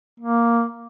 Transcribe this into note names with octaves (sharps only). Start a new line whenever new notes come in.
A#3